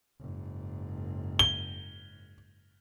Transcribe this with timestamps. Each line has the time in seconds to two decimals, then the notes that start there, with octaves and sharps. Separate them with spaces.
0.19 F#1 G#2
1.39 G7